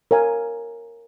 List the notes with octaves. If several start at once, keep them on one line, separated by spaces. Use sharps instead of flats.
A#4 C#5 F5 G#5